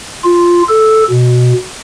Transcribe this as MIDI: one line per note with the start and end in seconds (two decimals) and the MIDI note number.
0.24 0.63 65
0.69 1.03 69
1.10 1.53 47